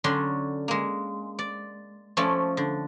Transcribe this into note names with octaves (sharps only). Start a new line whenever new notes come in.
D3 F#3 C#4 D4 C6
G#3 A#3
D5
F3 A3 C#4 D5
D3